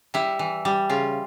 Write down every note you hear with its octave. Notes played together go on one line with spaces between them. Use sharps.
G3 E4
E3
G3
C#3 F4